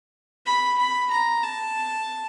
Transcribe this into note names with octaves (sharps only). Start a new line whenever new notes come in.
B5
B5
A#5
A5